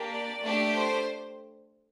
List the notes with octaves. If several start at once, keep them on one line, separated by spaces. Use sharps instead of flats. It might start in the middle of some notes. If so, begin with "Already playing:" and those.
Already playing: A#3 D4 G4
D5
A3 D4 G4
C5